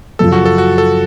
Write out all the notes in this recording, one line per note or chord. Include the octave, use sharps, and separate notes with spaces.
F#2 C#3 F3 A4
F#4
A4
F#4
A4